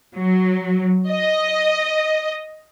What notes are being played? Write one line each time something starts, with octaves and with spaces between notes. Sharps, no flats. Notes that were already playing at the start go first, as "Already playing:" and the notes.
F#3
D#5